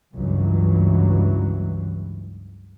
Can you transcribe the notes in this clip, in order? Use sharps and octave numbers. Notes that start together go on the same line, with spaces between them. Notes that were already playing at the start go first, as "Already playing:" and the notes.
C#2 G2 E3 F#3